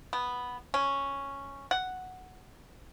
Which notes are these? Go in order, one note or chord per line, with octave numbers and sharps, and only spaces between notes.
B3
C#4
F#5